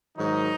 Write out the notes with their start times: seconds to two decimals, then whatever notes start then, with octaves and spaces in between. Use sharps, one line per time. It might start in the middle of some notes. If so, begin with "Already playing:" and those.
0.16 G#2 D#3 F#3 D#4